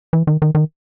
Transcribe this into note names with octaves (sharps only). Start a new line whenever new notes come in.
E3
D#3
D#3
D#3